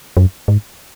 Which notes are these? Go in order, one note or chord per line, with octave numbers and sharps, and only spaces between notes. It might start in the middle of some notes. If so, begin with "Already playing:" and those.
F#2
G#2